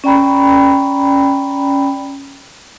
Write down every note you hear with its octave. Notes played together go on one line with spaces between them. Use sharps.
C#4 D5 G5 A#5 B5